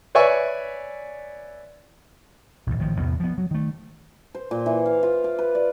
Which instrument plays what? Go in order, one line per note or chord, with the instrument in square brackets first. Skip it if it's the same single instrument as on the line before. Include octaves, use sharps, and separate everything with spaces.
[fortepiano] B4 C#5 D5 E5 G#5 C#6
[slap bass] A#1 D#2
A1 D#3 F3
A1 E2 C3 B3
F3 B3
F#3
D#3 A3
[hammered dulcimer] C5
A#2
E3
F5
F4
D6
B4
D5